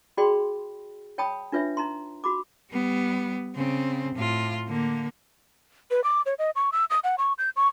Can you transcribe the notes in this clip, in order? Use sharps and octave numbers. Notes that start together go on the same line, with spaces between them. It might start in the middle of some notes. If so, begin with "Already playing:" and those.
F#4 G#4 D5 G5 B5 C6
C#5 G5 A5 B5 D#6
D4 F4 B4 C#5 E5
D#4 A#5 C6
F#4 B5 D6
G3 B3
C#3 C4
A2 F4
D3 A#3
B4
D6
C#5
D#5
C#6
E6
D#6
F#5
C#6
G6
C#6